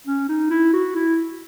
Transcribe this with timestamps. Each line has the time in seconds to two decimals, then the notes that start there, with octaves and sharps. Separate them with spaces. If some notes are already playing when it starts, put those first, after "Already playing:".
0.07 C#4
0.29 D#4
0.51 E4
0.73 F#4
0.96 E4